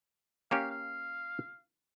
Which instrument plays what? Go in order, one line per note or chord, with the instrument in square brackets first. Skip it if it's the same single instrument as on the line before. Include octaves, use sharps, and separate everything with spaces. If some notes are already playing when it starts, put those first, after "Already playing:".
[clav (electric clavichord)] A#3 C#4 G4 [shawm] F5
[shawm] F5